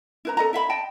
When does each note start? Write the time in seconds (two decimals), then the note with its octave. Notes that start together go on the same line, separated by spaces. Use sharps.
0.25 E4 B4 A#5
0.37 A4 D#5 A#5
0.53 E4 E5 F5 B5
0.70 D#5 G5 A5